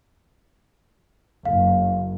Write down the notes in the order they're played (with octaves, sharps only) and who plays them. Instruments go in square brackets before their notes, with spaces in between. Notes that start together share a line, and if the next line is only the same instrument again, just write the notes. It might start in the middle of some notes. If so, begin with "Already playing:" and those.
[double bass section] F#1 [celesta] F5